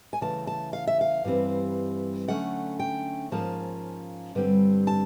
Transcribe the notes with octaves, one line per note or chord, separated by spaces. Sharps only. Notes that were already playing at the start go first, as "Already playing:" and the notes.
G#5
C#3 E3 A3 A5
A5
F5
E5
F5
G2 E3 G3 C4
D3 F#3 A3 C#4 F#5
G5
G#2 F3 A#3 C#4 A5
G2 D3 G3 C4
A5